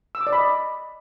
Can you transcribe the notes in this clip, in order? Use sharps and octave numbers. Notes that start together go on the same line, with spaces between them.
E6
D6
D5
B5
D#5